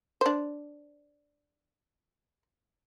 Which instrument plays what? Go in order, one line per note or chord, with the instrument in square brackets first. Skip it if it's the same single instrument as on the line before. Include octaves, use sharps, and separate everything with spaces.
[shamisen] D4 C5